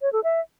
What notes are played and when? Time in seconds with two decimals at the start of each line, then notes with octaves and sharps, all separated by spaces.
0.01 C#5
0.12 A4
0.24 E5